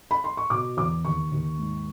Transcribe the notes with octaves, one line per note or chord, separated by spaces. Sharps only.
B5
C6
C#6
B2 D6
E2 D6
D#2 C#6
D#2
G#2